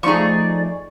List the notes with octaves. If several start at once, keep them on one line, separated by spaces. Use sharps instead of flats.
F3 A3 D#4 G#4 D5 C#6